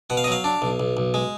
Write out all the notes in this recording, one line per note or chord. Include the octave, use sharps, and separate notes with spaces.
B2 F#5
F5
D#5
F#3 F5
D4
B1
B1
B1
G#3